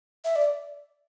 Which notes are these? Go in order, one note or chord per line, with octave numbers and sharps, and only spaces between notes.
E5
D5